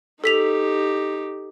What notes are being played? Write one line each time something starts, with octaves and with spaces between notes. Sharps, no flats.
D#4 G4 A4 B6 F7